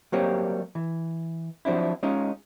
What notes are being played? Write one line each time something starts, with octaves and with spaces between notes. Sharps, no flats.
F#3 G3 A#3 C4 G4 C#5
E3
F3 F#3 C4 D4 E4
G#3 C#4 D#4 F4